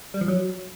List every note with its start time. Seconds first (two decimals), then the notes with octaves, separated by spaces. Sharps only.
0.14 G3
0.21 F3
0.28 F#3